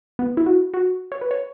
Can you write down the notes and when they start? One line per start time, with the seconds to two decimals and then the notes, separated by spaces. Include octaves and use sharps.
0.19 B3
0.37 E4
0.46 F#4
0.74 F#4
1.12 C#5
1.21 B4
1.31 C#5